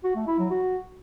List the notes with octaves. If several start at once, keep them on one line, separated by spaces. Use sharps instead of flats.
F#4
A3
E4
F#3
F#4